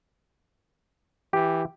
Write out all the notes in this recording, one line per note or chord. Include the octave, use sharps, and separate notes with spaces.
E3 G4